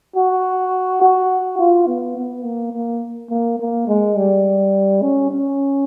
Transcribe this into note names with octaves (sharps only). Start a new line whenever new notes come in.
F#4
F#4
F4
B3
B3
A#3
A#3
A#3
A#3
G#3
G3
C#4
C#4